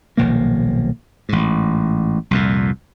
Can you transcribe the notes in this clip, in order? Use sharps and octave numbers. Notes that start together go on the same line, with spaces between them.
D#1 B1 F3 A#3
A1 G#2
C2 F2 A#2